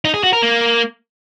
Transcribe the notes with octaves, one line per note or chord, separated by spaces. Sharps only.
D#4
G#4
F#4
A#4
A#3